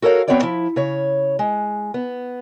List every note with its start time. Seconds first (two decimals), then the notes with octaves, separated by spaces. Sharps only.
0.02 F#4 A4 A#4 C#5 F5
0.28 E2 B3 C4 F#4 C#5 D5
0.42 F3 E4
0.76 C#3 C#5
1.39 G#3
1.94 B3